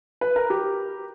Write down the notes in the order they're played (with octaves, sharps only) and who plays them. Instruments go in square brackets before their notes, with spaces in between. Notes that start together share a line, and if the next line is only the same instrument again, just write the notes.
[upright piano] B4
A#4
G4